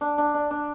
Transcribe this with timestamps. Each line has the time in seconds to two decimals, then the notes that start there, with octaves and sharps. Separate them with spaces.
0.01 D4
0.18 D4
0.34 D4
0.51 D4